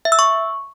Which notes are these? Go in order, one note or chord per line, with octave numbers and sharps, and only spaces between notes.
E5
E6
C#6